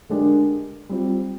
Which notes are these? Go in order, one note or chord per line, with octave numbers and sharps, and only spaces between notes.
D3 G#3 D4 G4 A#4
G3 C4 F4